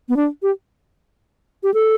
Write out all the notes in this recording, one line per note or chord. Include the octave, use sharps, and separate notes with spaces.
B3
D4
G4
G4
A4